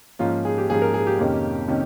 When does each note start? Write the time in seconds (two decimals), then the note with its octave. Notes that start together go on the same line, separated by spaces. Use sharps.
0.19 G#2 F3 A#3 C#4 F4
0.45 G#4
0.58 G4
0.69 G#2 F3 A#3 C#4 G#4
0.82 A#4
0.94 G#4
1.07 G4
1.19 F2 C3 D#3 A#3 C#4
1.68 C3 D#3 A#3 C#4